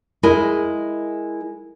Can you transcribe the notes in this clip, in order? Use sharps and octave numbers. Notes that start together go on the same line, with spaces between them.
G#3 E4 A#4 D#5 G#5